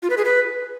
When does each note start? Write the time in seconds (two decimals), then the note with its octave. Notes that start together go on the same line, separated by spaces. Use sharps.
0.03 F4
0.10 B4
0.17 G#4
0.25 B4